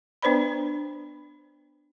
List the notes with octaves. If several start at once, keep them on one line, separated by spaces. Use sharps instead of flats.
B3 D4 B4 C5 D5 B5